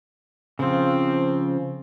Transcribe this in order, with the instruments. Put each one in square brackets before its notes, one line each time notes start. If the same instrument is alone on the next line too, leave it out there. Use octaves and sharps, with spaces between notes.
[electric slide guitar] C#3 F3 [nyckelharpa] C4